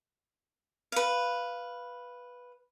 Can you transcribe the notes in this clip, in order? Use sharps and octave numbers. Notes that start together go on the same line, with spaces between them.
B4 F5